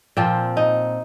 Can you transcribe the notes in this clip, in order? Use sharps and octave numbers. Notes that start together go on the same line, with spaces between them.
A#2 F3 C4
D#4